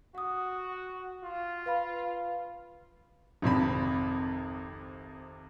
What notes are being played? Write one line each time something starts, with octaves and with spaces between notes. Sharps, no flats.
F#4 F#5 D#6
F4
B4 F5 B5
G#1 F2 C3 B5